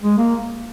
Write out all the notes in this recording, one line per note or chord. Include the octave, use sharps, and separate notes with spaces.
G#3
A#3